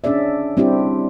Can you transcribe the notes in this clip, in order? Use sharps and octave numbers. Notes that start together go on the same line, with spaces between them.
C#4 D4 G#4 D5 E5
G3 C4 D4 E4 G4